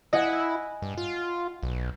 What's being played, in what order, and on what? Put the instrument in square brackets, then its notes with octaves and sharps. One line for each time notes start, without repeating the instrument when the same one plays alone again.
[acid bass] E4 [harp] D#5 F#5 G#5
[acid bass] G2
F4
B1